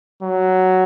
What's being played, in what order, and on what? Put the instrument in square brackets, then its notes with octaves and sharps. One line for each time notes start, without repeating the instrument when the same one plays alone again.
[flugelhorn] F#3